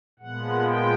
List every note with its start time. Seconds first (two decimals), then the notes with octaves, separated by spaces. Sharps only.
0.19 A#2 F3 G#3 B3 F#5
0.65 G5